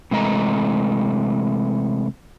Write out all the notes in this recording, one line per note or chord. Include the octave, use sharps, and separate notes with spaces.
C3 E3 G#3 A3 D#5 A#5